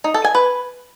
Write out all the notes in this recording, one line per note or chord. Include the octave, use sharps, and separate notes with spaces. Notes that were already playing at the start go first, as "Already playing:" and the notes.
D#4
A4
G#5
B4